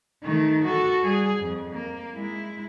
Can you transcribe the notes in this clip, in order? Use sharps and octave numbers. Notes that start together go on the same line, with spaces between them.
D#3 A3
F#4 A4
G3 G#4
F2
A#3
G#3 E4